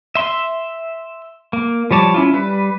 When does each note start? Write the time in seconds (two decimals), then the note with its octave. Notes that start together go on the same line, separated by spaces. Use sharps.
0.15 E5 C6
1.53 A#3
1.91 F3 G3 C#5 A5 D6
2.14 C#4 E4 F4
2.34 G3 B4